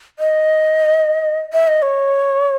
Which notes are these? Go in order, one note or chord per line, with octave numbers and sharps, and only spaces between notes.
D#5
E5
D#5
C#5